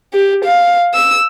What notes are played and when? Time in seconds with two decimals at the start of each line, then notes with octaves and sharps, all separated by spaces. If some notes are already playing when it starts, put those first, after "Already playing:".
0.14 G4
0.44 F5
0.94 E6